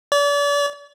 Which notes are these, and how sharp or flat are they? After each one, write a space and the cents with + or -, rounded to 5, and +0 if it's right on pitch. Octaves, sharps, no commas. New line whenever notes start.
D5 -40